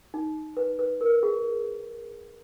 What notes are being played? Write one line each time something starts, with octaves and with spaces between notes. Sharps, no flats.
D#4
B4
B4
A#4
G#4